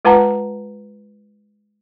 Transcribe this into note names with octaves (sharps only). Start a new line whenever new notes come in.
G#3 F4 B4 F#5 A5 A#5